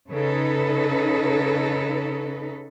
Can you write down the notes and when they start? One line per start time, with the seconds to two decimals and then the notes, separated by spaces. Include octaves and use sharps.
0.11 C#3 D#4 A4 B4